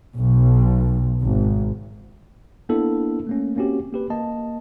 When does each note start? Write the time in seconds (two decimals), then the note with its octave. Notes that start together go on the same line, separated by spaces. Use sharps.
0.17 B1
1.21 G#1
2.69 A#3 B3 D4 E4 A4
3.27 A3 A#3 C#4
3.56 A#3 C4 C#4 F#4 G4
3.92 A#3 G4 B4
4.10 A#3 D#5 A5